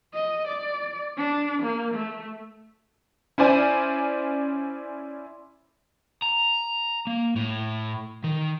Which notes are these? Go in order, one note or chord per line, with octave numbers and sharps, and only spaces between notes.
D#5
D5
D4
A#3
A3
C#4 E4 C5 D5 G#5
A#5
A#3
A2
D#3